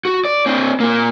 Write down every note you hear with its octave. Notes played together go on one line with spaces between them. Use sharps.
F#4
D5
C4 D4
A#3 F4